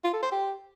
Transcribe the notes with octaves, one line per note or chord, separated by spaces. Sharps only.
F4
A4
C5
G4